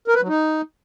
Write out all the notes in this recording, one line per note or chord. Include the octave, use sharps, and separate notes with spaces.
A#4
B4
F#3
D#4